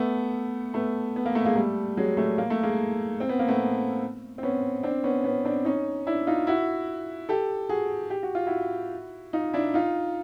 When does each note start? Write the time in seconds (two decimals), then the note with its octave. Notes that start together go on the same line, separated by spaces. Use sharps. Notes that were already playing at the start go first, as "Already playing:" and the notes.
Already playing: A3 B3
0.74 A3 B3
1.16 B3
1.25 A#3
1.35 A3
1.45 G#3 A#3
1.56 G3 A3
1.97 F#3 G#3
2.17 G3 A3
2.38 A#3
2.50 A3
2.63 G#3 A#3
3.20 C4
3.29 B3
3.39 A#3
3.48 A3 B3
4.38 C4
4.43 B3 C#4
4.83 C4 D4
5.03 B3 C#4
5.24 B3 C#4
5.45 C4 D4
5.65 C#4 D#4
6.07 D4 E4
6.27 D#4 F4
6.47 E4 F#4
7.29 G4 A4
7.69 F#4 G#4
8.10 G4
8.23 F#4
8.35 F4
8.47 E4 F#4
9.33 D#4 F4
9.53 D4 E4
9.74 D#4 F4